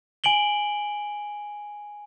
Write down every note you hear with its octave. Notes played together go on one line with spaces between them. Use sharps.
G#5 D7 F#7 G7